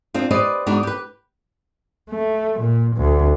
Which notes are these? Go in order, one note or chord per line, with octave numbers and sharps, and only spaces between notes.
C4 D4 F4
G4 B4 C5 D5 D#5
G#2 B3 D4 D#4 F#4
G4 B4
A3
A#2
D2